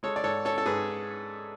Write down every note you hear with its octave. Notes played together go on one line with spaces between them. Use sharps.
G#3 A4 C#5
D5
G#2 A4 C#5
C#4 A4 C#5
A4
G#2 G#4 B4